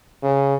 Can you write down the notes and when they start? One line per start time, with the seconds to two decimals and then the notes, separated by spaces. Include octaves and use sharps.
0.23 C#3